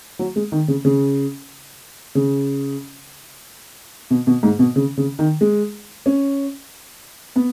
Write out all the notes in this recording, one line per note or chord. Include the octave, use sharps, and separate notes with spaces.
F#3
G#3
D#3
C#3
C#3
C#3
B2
B2
G#2
B2
C#3
C#3
D#3
G#3
C#4
B3